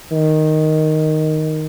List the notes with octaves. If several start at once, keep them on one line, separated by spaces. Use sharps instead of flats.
D#3